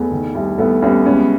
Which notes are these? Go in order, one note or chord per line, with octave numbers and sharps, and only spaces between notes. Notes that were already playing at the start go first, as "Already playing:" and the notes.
Already playing: E2 A3 B3
D#3
C2
C2 A3 B3
C2 B3 C#4
C#2 B3 C#4